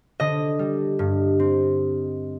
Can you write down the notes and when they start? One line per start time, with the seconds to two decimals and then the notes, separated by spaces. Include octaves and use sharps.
0.20 D3 D#5
0.59 G3
0.99 G2
1.39 C4